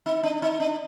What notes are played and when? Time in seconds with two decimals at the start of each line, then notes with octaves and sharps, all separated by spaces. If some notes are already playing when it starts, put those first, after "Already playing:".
0.06 D#4
0.23 D4
0.42 D#4
0.60 D4